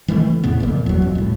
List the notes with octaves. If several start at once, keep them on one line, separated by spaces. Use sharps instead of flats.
D#3 E3 G3 A3
E2 A2 C#3 B3
F#1 F2 A#2
E2 F#3
F2
C2 A2